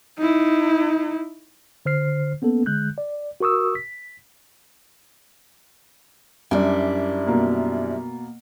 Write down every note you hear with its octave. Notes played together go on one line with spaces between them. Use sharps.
D#4 E4
D3 C5 F6 C7
A#3 B3 C#4 A4
D3 G#3 F#6 G6
D5
F#4 A#4 C#6 D#6 E6
B6
F#2 G3 D4 E4
B2 A#3